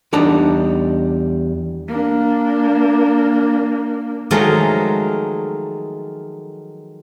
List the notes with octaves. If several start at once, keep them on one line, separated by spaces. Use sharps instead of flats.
E2 G3 D4 D#4 A5 A#5
A#3 D4
D#3 F3 F#3 G#3 A3